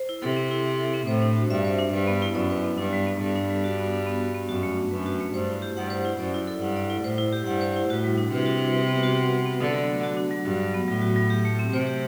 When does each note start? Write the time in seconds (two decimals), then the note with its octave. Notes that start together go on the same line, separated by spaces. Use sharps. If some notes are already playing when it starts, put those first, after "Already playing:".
Already playing: C5
0.09 E4
0.22 C3 A4
0.37 C4
0.51 E4
0.65 E5
0.80 A4
0.94 C4
1.07 A2 C5
1.22 D4
1.36 F#4
1.50 G2 E5
1.64 C5
1.79 D4
1.93 G2 B4
2.07 B3
2.22 E4
2.35 F#2 D5
2.50 B4
2.64 B3
2.78 G2 D4
2.93 G3
3.07 B3
3.21 G2 A4
3.36 D4
3.49 G3
3.64 F#4
3.78 B3
3.93 D4
4.06 B3
4.20 F#4
4.35 B3
4.49 F#2 F#4
4.63 A3
4.77 D4
4.91 F#2 B4
5.06 F#4
5.20 A3
5.34 G2 C5
5.49 E4
5.62 G4
5.76 G2 F#5
5.90 C5
6.05 E4
6.19 F#2 D5
6.34 E4
6.47 A4
6.62 G2 F#5
6.76 D5
6.90 E4
7.04 A2 C5
7.18 E4
7.32 G4
7.47 G2 F#5
7.61 C5
7.76 E4
7.89 A2 F#4
8.04 G3
8.18 D4
8.32 C3 B4
8.46 F#4
8.60 G3
8.75 B4
8.89 B3
9.03 F#4
9.18 F#5
9.31 B4
9.46 B3
9.60 D3 D4
9.74 F#3
9.89 A3
10.03 F#4
10.17 D4
10.31 F#3
10.45 G2 F#4
10.60 F#3
10.74 B3
10.88 A2 F#3
11.02 F#4
11.16 F#3
11.30 G4
11.45 A3
11.59 C4
11.73 C3 C5
11.87 G4